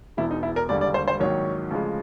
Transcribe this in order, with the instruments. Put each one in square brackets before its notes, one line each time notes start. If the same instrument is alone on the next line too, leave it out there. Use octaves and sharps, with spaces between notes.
[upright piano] E1 E2 B2 E4
D#4
E4
A#4
E1 D#2 D3 G3 A#3 D5
D5
C5
C5
A#1 G#2 D#3 F#3 C#5
D2 C#3 F3 G#3